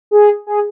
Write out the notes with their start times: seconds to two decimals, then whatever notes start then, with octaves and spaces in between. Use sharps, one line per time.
0.11 G#4
0.47 G#4